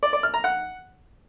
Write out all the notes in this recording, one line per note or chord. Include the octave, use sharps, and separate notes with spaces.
D5
D5
F6
A#5
F#5